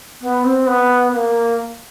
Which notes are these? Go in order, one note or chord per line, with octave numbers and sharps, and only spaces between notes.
B3
C4
B3
B3
A#3